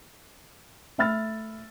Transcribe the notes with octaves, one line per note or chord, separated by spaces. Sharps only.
A3 E5 B5 E6 F6 A6